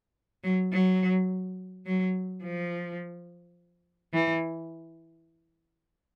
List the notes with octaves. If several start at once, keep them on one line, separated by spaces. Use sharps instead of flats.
F#3
F#3
F#3
F3
E3